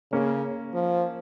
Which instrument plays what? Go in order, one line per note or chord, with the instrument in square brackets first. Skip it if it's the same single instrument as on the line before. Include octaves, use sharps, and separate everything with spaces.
[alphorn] C#3 [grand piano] A#3 C#4
[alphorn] F3